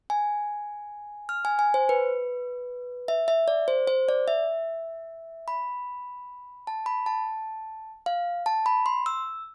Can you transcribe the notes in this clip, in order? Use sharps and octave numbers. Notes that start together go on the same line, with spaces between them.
G#5
F6
G#5
G#5
C5
B4
E5
E5
D5
C5
C5
D5
E5
B5
A5
B5
A5
F5
A5
B5
C6
E6